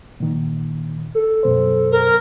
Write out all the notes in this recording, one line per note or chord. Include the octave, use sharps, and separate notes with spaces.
A#2 D#3
A4
F#2 B2 C5
A#4